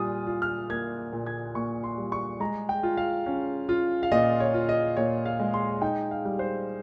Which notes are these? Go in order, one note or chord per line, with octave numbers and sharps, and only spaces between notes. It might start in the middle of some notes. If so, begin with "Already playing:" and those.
Already playing: A#2 G3 F4 G#5 D#6
F4
F6
A#3 G#6
A#2
G#6
A#2 C#6
C6
G3
C#6
G#3 A#5
G5
F4
F5
C#4
F4
F5
A#2 D#5
C#5
F4
D#5
A#2 C#5
F5
G#3
C6
D#4 G5
F5
G3
C5